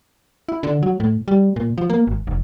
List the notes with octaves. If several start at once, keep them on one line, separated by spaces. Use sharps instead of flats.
E4
D3
F#3
A2
G3
A#2
F3
A#3
G#1
F1